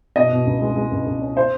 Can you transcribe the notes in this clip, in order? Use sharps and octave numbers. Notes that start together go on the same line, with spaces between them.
B2 D#5
B2
C#2
G#3
G#3
C#2
C#2
C#4
C5